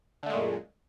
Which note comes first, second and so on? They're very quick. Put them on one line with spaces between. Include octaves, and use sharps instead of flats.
D3 A3 G#3 A#2 F#2